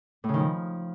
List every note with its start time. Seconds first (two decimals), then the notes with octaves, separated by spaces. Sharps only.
0.24 A2
0.29 C#3
0.34 D#3
0.39 F3